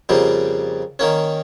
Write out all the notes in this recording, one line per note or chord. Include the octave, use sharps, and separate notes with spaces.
F2 C#3 G3 A#3
D#3 A#3 C#4